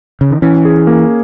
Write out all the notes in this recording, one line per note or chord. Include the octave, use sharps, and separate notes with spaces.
C#3
D#3
E3 C#4
G#4
A#3